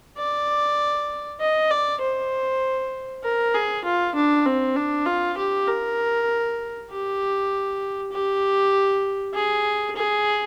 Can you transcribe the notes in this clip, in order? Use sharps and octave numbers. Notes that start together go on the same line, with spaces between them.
D5
D#5
D5
C5
A#4
G#4
F4
D4
C4
D4
F4
G4
A#4
G4
G4
G#4
G#4